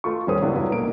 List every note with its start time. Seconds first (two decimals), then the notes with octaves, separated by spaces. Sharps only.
0.04 A3 F4 C#6
0.27 D#1 G3 C#4 A4 C5 D#6
0.42 C#2 B3 D4 E4
0.56 G2 F#3 E4
0.71 B1 A#3 D7